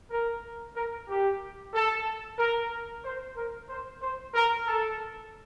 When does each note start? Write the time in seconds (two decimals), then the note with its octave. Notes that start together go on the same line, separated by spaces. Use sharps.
0.11 A#4
0.76 A#4
1.09 G4
1.74 A4
2.39 A#4
3.05 C5
3.37 A#4
3.70 C5
4.02 C5
4.35 A#4
4.67 A4